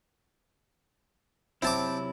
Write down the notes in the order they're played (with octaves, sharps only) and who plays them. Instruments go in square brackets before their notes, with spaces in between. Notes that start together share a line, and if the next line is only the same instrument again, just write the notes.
[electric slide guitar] C3 F#3 E4 [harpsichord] C4 A5 D6